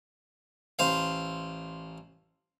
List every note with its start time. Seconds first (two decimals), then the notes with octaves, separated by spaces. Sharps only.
0.79 A1 C5 F5